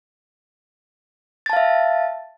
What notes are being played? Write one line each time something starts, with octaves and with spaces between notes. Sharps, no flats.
E5 F5 A5 A6